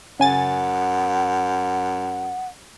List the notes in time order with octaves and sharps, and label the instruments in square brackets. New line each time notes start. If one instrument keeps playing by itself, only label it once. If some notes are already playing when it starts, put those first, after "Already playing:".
[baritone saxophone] F#2 [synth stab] C#3 G#5 A6 [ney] F#5